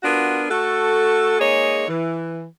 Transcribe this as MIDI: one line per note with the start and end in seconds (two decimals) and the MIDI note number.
0.03 0.44 59
0.03 0.44 62
0.03 0.44 65
0.03 0.44 66
0.03 0.44 70
0.49 1.37 57
0.49 1.37 66
0.49 1.37 69
1.40 1.85 56
1.40 1.85 58
1.40 1.85 63
1.40 1.85 68
1.40 1.85 73
1.87 2.44 52